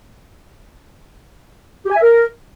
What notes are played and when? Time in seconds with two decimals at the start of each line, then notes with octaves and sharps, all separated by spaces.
1.86 G4
1.91 G#5
1.96 E5
2.02 A#4